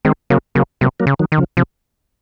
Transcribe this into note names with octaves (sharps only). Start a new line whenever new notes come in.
D#3 G#3 C4
C#3 F#3 A#3
C#3 F#3 A#3
C3 F#3 A#3
F#3 A#3
C#3
D#3 F#3
D#3
C#3 F3
C3 F3